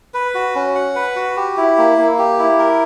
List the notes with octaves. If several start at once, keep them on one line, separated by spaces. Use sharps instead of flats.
B4
F#4
C#4
F#5
B4
F#4
G4
E4
A#3
A#3
G4
E4
A#4